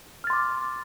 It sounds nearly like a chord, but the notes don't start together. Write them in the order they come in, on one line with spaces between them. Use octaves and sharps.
F6 A6 C6 D6